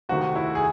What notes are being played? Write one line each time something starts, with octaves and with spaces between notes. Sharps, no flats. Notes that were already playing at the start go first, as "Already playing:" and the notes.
C2 C3 D#3 A3 F#4
E4
G#4